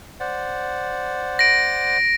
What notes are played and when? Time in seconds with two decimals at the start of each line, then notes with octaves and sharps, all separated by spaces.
0.20 C5 D5 F#5
1.39 A#6 D7